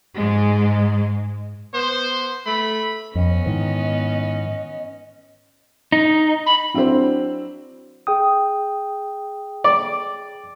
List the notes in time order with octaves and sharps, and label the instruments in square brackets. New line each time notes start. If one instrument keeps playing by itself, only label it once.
[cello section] G#2 G#3
[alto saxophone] B3 [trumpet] C5
[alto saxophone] A3 [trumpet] B5
[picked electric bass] F2 [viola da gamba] B3 C#4 [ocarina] D#5
[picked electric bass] G#2 D#3 E3
[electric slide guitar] D#4
[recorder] B5
[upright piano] F#3 C4 D4 E4 C5
[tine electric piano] G#4 G5 D#6
[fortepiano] D5